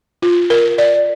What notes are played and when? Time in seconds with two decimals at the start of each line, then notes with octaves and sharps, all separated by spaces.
0.22 F4
0.50 A#4
0.78 D5